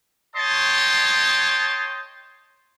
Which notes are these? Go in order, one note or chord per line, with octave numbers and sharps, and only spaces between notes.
C#5 D#5 G5 A5 C6